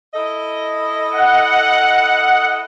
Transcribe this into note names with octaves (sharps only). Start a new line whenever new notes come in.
E4 A4 D#5
F#5